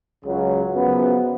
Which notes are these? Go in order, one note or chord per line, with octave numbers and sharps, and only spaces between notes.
C#2 C#3 F#3
F#2 C#3 F3 B3